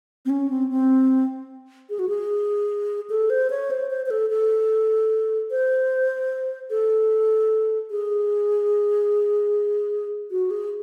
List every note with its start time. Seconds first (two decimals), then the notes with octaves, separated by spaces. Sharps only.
0.25 C4
0.30 C#4
0.50 C4
0.70 C4
1.90 G#4
1.99 F#4
2.09 G#4
3.10 A4
3.30 C5
3.50 C#5
3.71 C5
3.90 C5
4.06 C5
4.10 A4
4.30 A4
5.51 C5
6.70 A4
7.91 G#4
10.31 F#4
10.51 G#4